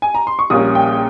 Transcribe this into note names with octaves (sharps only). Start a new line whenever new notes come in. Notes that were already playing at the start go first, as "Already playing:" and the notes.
G#5
A#5
C6
C#6
A#1 A#2 G3 A#3 C#4 D#6
G5